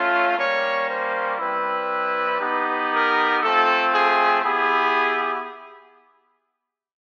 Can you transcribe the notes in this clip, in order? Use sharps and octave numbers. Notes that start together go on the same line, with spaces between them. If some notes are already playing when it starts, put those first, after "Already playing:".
Already playing: A3 C#4 F4
G3 A#3 C#4 C#5
C5
G3 C4 E4 B4
B3 D#4 G4
A#4
A3 C4 F4 A4
G#4
B3 E4 G4 G#4